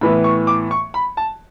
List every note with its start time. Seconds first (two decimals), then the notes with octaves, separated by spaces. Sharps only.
0.01 A2 E3 B3 B5
0.24 C#6
0.47 D6
0.71 C#6
0.94 B5
1.17 A5